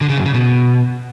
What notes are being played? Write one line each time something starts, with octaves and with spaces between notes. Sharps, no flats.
D3
C#3
F#2
C#3
B2